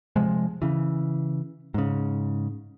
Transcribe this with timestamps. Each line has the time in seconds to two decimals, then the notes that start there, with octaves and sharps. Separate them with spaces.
0.16 C3 F3 G#3
0.62 C#3 E3
1.74 G#2 C#3